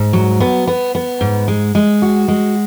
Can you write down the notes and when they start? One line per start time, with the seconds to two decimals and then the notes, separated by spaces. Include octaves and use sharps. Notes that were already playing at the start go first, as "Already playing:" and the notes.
Already playing: G#2
0.13 F#3
0.40 B3
0.67 B3
0.95 B3
1.21 G#2
1.48 G#3
1.75 G#3
2.02 F#4
2.28 G#3